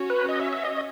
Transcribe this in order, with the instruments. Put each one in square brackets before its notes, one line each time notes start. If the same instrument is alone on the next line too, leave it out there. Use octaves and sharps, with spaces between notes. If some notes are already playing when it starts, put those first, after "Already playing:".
Already playing: [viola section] C#4 F#4 C#5
[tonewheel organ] B4
D#5
E5
E5
D#5